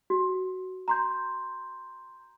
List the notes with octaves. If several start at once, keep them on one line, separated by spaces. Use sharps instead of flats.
F#4
A#5 C6 G6